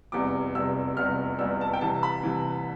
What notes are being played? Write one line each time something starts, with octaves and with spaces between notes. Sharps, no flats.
F1 E2 C3 G3 D6
F1 E2 C3 G3 E6
F1 E2 C3 G3 F6
F1 E2 C3 G3 E6
A5
G5
C2 C3 E3 A5
B5
C2 C3 E3